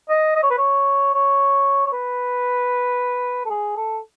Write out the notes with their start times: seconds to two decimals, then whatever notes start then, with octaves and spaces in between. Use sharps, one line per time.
0.09 D#5
0.36 D#5
0.43 C#5
0.50 B4
0.58 C#5
1.14 C#5
1.86 C#5
1.92 B4
3.45 A4
3.50 G#4
3.77 A4